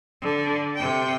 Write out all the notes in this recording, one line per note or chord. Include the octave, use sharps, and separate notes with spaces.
D3
C3 G5